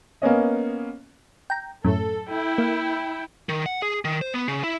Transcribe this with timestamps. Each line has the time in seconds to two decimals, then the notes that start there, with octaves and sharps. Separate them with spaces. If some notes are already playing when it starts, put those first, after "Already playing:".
0.22 A#3 B3 C#4 D#5
1.50 G5 A#5
1.85 F#2 A2 A4
2.28 E4 G5
2.58 A#3
3.49 D#3
3.66 F#5
3.82 G#4
4.05 D#3
4.21 C5
4.34 B3
4.48 C#3
4.64 E4